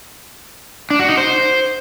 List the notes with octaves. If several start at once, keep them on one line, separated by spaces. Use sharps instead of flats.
D4
F#4
D#4
C5